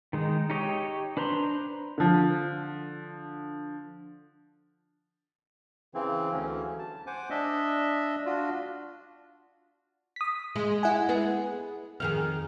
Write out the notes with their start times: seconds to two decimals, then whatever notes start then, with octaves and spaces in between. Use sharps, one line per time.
0.13 D#3 G#3 D#4
0.50 D#4 G4 C#5 D#5
1.17 D4 B4 C5 A#5 C6
1.98 D3 F3
5.94 C#3 E3 C4
6.32 D2 E3 F#3 C#4
6.79 A5
7.07 C5 F#5 G#5 D6
7.30 D4 D#5 E5
8.26 D4 F4 F#4
10.16 D#6 B6
10.56 G#3
10.83 E4 F#5 G#5
11.09 B3 G#4
12.00 F2 D#3 G#4 F6